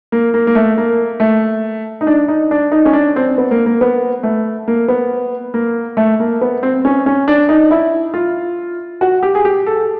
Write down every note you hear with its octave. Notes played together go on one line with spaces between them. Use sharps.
A#3
A#3
A#3
A3
A#3
A3
D#4
D4
D#4
D4
D#4
C#4
D4
C4
B3
A#3
A#3
B3
A3
A#3
B3
A#3
A3
A#3
B3
C4
C#4
C#4
D4
D#4
E4
F4
F#4
G4
G#4
G4
A4